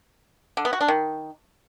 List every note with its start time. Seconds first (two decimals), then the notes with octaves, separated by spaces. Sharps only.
0.57 D3
0.65 B3
0.73 F#4
0.81 D4
0.88 D#3